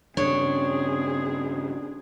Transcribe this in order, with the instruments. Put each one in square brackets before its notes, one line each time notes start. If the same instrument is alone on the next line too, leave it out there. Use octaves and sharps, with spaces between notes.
[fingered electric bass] G2 C#3 [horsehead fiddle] C4 G#4 [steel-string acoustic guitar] D4 [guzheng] C#5